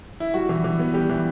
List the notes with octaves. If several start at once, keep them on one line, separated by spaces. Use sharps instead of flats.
E4
G3 F#4
E3
E3
B3
G3 G4
E3